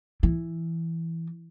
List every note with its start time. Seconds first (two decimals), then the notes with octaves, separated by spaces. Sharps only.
0.23 E3